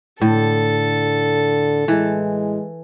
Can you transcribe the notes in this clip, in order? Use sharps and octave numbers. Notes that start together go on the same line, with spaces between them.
A2 D3 A4
E3 G#3